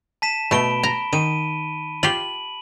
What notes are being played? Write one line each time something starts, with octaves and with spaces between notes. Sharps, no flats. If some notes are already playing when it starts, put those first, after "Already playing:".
A5 B6 E7
B2 A3 B5 D7 G7
A#5
D#3 D#7
F4 G4 F#7